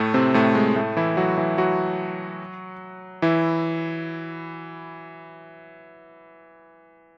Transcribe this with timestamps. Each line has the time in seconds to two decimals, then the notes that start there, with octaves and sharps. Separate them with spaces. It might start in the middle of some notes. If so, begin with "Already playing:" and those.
Already playing: A2 A3
0.14 C3 C4
0.34 A2 A3
0.55 G#3
0.76 A2 A3
0.97 E3 E4
1.17 F#3 F#4
1.37 E3 E4
1.58 F#3 F#4
3.22 E3 E4